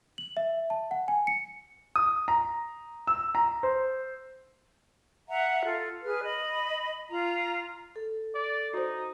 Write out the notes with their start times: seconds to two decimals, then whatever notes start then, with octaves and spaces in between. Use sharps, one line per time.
0.18 F#7
0.37 E5
0.70 A5
0.91 F#5
1.08 G#5
1.27 C#7
1.96 D#6
2.28 A#5
3.07 E6
3.35 A#5
3.63 C5
5.28 E5 F#5 A#5
5.64 F4 A4
6.03 G#4 B4 F6
6.24 D#5 B5
7.09 F4 A#5
7.96 A4
8.35 D5
8.73 D#4 F#4 C5